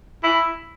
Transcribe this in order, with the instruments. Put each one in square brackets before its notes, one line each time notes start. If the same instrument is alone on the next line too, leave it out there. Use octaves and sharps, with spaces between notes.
[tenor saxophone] E4